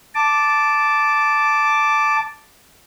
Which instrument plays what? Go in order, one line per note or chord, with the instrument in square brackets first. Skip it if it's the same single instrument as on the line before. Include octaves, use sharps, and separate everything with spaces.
[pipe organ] A5 D6